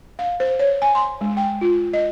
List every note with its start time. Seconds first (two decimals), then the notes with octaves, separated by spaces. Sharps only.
0.19 F5
0.40 C5
0.59 C#5
0.82 G#5
0.95 C6
1.21 G#3
1.37 G5
1.61 F4
1.93 D#5